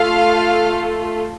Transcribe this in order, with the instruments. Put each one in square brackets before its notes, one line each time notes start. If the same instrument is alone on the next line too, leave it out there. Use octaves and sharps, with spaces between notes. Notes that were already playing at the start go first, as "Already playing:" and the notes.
Already playing: [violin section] A3 F4 A4 F5